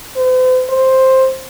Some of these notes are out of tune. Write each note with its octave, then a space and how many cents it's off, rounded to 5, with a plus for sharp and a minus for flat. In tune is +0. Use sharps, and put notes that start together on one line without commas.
C5 -45
C5 +5